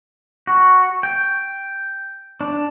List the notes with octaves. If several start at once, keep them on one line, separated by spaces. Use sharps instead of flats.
F#4
G5
D4